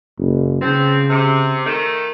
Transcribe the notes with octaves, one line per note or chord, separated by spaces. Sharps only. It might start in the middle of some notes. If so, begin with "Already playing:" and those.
F#1
C#3 F3 B3 C4
C3
D#3 A3